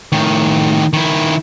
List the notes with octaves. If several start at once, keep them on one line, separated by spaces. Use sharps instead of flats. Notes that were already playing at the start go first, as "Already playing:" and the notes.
A2 D#3
D#3 E4